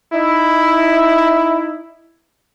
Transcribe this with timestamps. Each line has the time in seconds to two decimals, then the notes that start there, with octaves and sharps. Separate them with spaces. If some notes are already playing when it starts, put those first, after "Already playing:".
0.13 D#4 E4